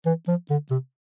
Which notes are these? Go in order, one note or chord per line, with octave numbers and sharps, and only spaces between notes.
E3
F3
D3
C3